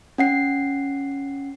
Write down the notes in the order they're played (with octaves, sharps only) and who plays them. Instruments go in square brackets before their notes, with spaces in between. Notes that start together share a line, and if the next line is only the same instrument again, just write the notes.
[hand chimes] C#4 F#5 C7